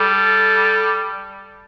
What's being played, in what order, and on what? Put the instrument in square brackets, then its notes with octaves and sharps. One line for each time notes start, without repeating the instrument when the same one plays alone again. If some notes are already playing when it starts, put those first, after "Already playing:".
Already playing: [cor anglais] G3 [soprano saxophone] A4